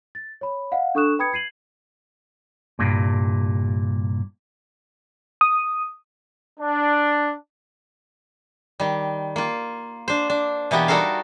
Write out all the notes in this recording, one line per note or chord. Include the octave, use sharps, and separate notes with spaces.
A6
C#5 B5
D#5 F5 F#5
D4 A4 C#6 D#6 F#6 E7
B4 G5 B5 D#6 G#6 C#7
G#6 C7 D#7 F#7
C2 G2 A#2
D#6
D4
D#3 G3
A#3 F4
D4 C5
D4
B2 E3 A#3 B3 G4
G3 D#4 F#4 A4 A#4 F5